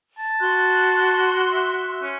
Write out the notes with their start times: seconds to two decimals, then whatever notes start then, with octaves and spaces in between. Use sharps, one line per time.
0.19 A5
0.40 F#4 C6 F#6
1.53 E5
2.03 C#4